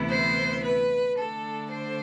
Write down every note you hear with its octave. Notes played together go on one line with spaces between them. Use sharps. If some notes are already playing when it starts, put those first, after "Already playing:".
Already playing: D2 C3 E3 B3 E4
C5
B4
D3 A3 D4 A4
C5